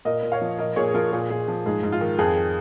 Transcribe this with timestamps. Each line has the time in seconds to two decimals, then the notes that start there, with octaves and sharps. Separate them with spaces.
0.05 A#2 A#4 D#5
0.23 A#2
0.32 C#5 F5
0.42 F3
0.58 A#2 A#4 D#5
0.76 A#2 G#4 C#5
0.89 G#4
0.94 F3 F4 A#4
1.12 A#2 G#4
1.30 A#2 G#4
1.48 F3
1.66 G#2 G#4
1.83 G#2
1.92 F4
2.01 D#3
2.19 F2 G#4